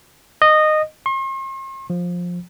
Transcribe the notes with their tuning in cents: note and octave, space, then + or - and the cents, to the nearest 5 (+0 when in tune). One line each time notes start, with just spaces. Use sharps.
D#5 -15
C6 +45
F3 +15